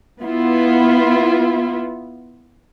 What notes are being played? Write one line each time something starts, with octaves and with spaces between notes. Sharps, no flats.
B3 E4 F4